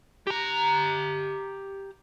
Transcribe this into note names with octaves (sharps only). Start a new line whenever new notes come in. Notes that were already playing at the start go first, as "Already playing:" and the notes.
G4 A#5